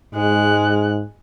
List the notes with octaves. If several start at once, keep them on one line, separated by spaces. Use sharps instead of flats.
G#2 G#3 F#6